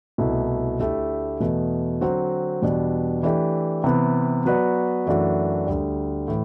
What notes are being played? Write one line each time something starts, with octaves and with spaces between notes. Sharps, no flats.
C2 B2 A3 E4
D2 D3 A3 E4 G4
E2 B2 A3
D3 F#3 C4 F#4 C5
E2 B2 G3 D4
E3 A3 D4 G4
C3 E3 B3
F#3 B3 F#4 B4 D5
F#2 E3 A3 D4 F#4
D2 D3 G3
A2 E3